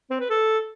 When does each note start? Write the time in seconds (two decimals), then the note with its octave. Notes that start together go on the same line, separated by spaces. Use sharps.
0.10 C4
0.20 B4
0.30 A4